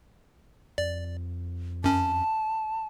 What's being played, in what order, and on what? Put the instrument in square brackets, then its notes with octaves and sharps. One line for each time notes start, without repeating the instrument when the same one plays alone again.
[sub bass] F2 [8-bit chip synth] D5
[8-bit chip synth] F#2 C#4 [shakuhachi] A5